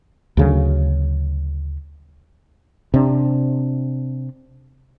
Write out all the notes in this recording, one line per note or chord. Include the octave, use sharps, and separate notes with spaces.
D2 C#3 F#3
C3 D4